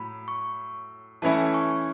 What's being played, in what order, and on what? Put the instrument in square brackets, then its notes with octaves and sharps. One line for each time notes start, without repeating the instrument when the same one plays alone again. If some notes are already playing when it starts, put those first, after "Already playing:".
Already playing: [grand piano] A2 F#3 [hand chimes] B5
[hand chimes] C#6
[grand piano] E3 A3 C#4 E4 [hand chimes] A5
[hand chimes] C#6